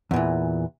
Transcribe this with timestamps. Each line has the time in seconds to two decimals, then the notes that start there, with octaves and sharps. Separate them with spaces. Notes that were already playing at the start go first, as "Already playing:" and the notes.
0.11 E2
0.14 A#2
0.16 E3